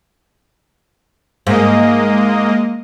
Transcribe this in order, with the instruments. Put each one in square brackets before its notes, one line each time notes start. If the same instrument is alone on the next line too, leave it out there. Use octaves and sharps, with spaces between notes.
[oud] G#2 [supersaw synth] G#3 A#3 D#5